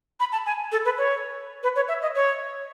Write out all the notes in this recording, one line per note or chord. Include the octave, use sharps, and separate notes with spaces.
B5
A5
G#5
A4
B4
C#5
B4
C#5
E5
D#5
C#5